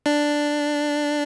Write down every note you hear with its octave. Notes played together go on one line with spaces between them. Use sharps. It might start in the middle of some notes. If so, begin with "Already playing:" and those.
D4